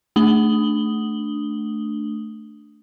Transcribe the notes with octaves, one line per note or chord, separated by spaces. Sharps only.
A3 D4 D#6 F#7 G7